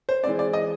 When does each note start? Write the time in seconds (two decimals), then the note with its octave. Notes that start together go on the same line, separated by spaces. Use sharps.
0.09 C5
0.23 C4 D5
0.26 E3 G#3
0.39 D5
0.53 D#5